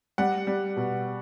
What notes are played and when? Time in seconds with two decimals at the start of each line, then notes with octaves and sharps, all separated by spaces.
0.18 G3 F#5
0.47 G3
0.77 B2